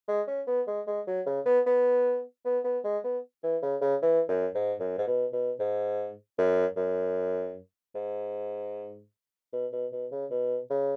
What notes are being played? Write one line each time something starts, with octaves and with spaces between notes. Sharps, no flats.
G#3
C#4
B3
G#3
G#3
F#3
C#3
B3
B3
B3
B3
G#3
B3
E3
C#3
C#3
E3
F#2
G#2
F#2
G#2
B2
B2
G#2
F#2
F#2
G#2
B2
B2
B2
C#3
B2
C#3